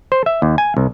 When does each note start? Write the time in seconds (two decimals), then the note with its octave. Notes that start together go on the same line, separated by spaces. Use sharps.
0.12 C5
0.26 E5
0.42 D#2
0.58 G#5
0.77 C2